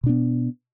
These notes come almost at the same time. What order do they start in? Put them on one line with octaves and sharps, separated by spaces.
B2 D4 B3